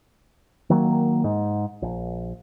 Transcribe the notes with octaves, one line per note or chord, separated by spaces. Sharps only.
D#3 F#3 A#3
G#2
A#1